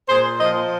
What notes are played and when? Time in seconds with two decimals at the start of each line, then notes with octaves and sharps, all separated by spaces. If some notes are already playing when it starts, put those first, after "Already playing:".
0.09 A#2 G#4 C5
0.40 F3 C5 D#5